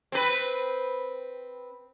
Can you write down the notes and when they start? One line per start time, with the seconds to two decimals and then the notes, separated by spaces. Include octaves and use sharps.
0.12 C4 B4